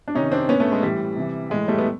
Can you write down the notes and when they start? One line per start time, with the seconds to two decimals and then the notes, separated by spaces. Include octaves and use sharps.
0.08 D4
0.15 C3 D#3 C#4 D#4
0.32 C4 D4
0.48 A#2 B3 C#4
0.60 A3 B3
0.72 G#3
0.83 A2 E3 G3
1.16 C3 E3
1.50 A2 E3 G#3
1.68 G3 A3
1.78 B3